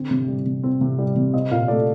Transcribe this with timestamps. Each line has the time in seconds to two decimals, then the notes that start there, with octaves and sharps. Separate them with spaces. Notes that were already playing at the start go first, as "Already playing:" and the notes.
Already playing: D3 C4
0.11 C3
0.28 G3
0.46 C3
0.63 C4
0.81 C3
0.99 G3
1.16 C3
1.34 C4 D#5
1.51 A#2 F5
1.68 A3 D5